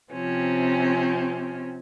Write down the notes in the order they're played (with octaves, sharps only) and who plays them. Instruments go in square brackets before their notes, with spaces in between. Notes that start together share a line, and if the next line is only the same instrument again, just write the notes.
[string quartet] C3 F3 C4 C#4